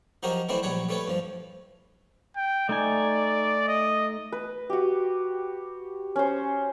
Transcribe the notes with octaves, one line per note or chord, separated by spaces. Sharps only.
F3 F#3 D#4 F#4 G4 A#4
E3 F#3 A3 C4 D4 E4
A#1 F#3 G3 C#5 F#5 B5
G3 A3 A4 B4 C#5
G2 F3
G5
A3 D#4 D5 G#5
D#5
B4
F#4 G4
C#4 C5